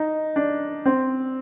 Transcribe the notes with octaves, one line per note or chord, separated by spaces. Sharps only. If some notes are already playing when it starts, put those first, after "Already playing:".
Already playing: D#4
D4
C4